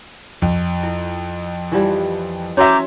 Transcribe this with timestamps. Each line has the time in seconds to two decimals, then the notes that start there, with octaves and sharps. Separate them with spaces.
0.42 F2
0.83 E4
1.72 E3 F3 G3
2.57 C#4 F#4 C#5 E5 A#5 D6 G6